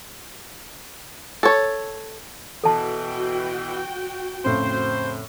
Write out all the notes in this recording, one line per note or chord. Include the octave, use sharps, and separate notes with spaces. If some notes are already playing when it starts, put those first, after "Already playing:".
A4 C#5
B2 E3 F#4 A4 G5 A5
F2 A2 C#3 C5